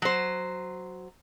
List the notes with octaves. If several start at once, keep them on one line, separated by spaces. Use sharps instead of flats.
F#3 C5